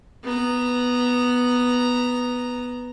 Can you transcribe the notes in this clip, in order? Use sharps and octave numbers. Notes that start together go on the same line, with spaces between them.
B3 A#5